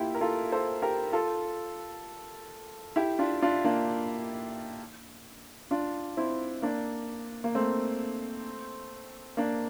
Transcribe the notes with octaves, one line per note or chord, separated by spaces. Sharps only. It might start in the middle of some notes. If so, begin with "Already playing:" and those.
Already playing: A#3 E4 F4 G4
A#4
F4 A4
A4 C5
G4 A#4
F4 A4
E4 G4
D4 F4
D4 F4
A#3 D4
D4 F4
C4 E4
A#3 D4
A#3
A3 C4
A#3 D4